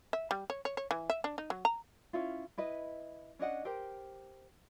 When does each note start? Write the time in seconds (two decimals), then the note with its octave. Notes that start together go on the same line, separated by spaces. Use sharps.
0.13 E5
0.31 G3
0.50 C#5
0.65 C#5
0.77 C#5
0.91 E3
1.10 E5
1.24 D4
1.38 D#4
1.50 F#3
1.65 A#5
2.13 C#4 E4 F4
2.58 E4 B4 D#5
3.39 C#4 D4 D#5 F#5
3.65 G4 A#4 C5